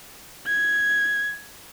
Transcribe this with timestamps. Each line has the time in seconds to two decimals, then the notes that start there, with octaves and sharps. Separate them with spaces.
0.47 G#6